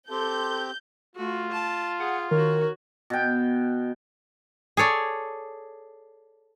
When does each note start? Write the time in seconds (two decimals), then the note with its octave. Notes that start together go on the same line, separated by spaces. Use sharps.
0.10 C4 G4 A4 C6 D6 G6
1.16 A3 F4 F#4
1.52 A5
2.00 G#4 F#5
2.31 D#3 F#4 A#4 C#5
3.10 B2 G5
4.77 G#4 A4 C#5 D5